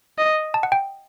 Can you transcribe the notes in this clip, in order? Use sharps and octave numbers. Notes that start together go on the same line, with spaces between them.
D#5
A5
F#5
G5